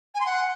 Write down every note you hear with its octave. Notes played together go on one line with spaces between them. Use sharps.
G#5
C6
F#5